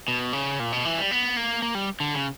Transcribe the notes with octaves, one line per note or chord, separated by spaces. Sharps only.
B2
C#3
A#2
B2
E3
G3
B3
A#3
A#3
G3
D3
C#3